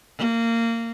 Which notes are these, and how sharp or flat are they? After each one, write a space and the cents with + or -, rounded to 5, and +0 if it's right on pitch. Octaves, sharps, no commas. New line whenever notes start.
A#3 -20